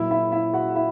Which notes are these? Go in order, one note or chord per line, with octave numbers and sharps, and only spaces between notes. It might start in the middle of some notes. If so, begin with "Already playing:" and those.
Already playing: A#2 F#3 E4 E5
E4 E5
E4 E5
F#4 F#5
E4 E5